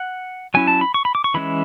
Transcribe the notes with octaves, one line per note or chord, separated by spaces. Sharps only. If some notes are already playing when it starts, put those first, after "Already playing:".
Already playing: F#5
F#3 C#4 E4 G#5
A5
B5
C#6
B5
D6
C#6
E3 G#3 C#4 E4 B5